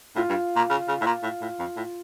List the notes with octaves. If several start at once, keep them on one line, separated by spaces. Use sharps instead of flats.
A2 F4
G2
A#2
C#3
C#3
A2
A#2
A2
A2
F2
A2